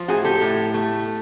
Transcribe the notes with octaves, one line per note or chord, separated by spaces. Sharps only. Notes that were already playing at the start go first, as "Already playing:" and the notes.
Already playing: F3
A2 F#4 G#4
G4 A4
A2
A3